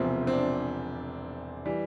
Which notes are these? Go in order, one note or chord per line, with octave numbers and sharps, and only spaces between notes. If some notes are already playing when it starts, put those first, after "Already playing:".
Already playing: E1 E2 C3 F3 C4
C4
D4
E3 G3